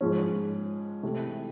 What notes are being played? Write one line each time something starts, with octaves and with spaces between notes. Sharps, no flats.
G#2 F3 G#3 C#4
C3 E3 A3